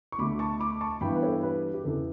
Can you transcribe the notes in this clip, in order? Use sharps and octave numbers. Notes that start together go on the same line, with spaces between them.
C#6
D2 D3 A3 B5 D6
A5 C#6
B5 D6
A5 C#6
G2 E3 B3 G5 B5
B4
A4 C#5
G4 B4
G4
E2 C#3 E3 B3 A4